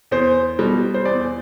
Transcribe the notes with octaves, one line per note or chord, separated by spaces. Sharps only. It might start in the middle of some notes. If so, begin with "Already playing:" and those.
E2 C5
B2 G3
C5
E2 D5